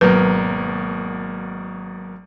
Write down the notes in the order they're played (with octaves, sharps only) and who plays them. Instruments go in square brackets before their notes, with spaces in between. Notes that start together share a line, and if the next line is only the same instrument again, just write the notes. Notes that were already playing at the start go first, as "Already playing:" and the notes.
[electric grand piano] G#1 B2 A#4 [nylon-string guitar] F#3 A#3 D5 [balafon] B4